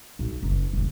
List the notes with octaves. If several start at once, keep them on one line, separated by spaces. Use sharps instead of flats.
B1
F#1
E1 A#1